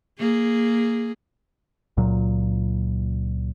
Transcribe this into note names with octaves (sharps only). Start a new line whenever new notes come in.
A#3 G#4
C#2 A#2 F#3